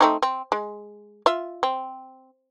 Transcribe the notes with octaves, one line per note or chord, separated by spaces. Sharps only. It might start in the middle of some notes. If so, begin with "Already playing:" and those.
A3 C4 D#4
C4
G#3
F4 E5
C4